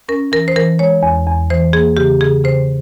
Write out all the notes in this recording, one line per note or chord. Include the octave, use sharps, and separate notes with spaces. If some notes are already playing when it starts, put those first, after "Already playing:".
C#4 A#4
E3 A#4
C5
E3 A#4
G#3 C#5
E2
E2
E3 C5
A#3 G#4
C#3 G4
C#3 G#4
C#3 C5